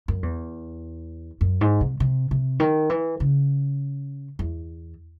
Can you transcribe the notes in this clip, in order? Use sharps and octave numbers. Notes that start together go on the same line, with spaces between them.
F#2
E2
F#2
G#2
C3
C3
C3
D#3
E3
C#3
E2